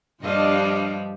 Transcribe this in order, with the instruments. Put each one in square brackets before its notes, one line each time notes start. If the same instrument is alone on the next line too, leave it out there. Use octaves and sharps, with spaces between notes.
[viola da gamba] G2 F3 G3 [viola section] D4 D#5 F5